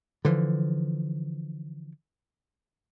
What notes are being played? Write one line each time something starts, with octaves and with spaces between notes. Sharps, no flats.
D3 E3 F3